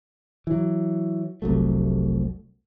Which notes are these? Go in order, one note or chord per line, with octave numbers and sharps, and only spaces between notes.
E3 F#3
F1 C2 F#3 A3